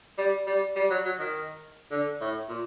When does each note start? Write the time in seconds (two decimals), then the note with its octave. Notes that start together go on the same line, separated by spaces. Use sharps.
0.18 G3
0.47 G3
0.76 G3
0.90 F#3
1.05 F#3
1.19 D#3
1.91 D3
2.21 A2
2.49 A#2